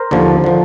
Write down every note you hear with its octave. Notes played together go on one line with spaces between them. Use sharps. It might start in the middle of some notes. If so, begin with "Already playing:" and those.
Already playing: A#4 C5
D#2 D3 F3
D3 F3